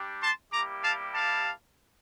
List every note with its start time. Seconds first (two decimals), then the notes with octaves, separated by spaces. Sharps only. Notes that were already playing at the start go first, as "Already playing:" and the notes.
Already playing: G3 D4 G4
0.21 A5 C6
0.52 G3 A#3 E4 G4 A#5 D6
0.83 F5 A5
1.14 F5 A5